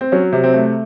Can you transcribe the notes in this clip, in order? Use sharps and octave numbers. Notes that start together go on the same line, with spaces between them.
C4
F#3 C#4
C3
C4
A3